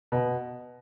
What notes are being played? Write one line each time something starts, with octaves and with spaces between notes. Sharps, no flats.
B2